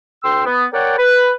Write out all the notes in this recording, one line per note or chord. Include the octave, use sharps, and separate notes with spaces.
D2 G5 C6 E6
B3
A#4 C#5 D5 F#5 G5
B4